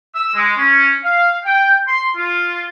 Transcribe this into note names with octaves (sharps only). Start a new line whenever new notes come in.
E6
G#3
C#4
F5
G5
C6
F4